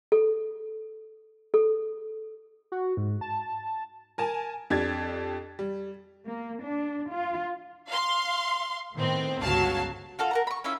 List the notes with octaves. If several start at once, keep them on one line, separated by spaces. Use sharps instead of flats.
A4
A4
F#4
G#2
A5
A#4 G#5 A5
F2 D4 G4 G#6 A6
G3
A#3
D4
F4
F5 C6
A2 D#3 B3 C4
G1 C#2 F#3 F5 A5
F4 F#4 A4 F5
A#4 F#5 A#5
B5 C#6
C#4 E4 F4 E5